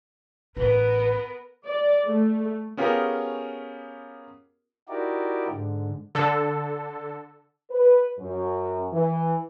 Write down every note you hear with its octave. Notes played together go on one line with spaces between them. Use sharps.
A1 B3 F4 A#4 B4
D5
A3
B3 C#4 F4 G4 G#4 A#4
D#4 E4 F#4 G4 A#4 D5
G#2 D3
D3 A4
B4
F#2
E3